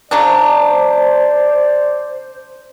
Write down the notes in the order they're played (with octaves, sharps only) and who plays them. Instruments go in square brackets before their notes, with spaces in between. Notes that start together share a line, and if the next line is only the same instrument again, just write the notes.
[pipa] C#3 F#3 D4 [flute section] C5 [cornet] D5